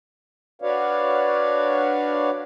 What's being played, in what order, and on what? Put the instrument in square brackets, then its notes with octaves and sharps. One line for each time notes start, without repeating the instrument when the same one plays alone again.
[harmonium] D4 F#4 B4 C#5 D5 F5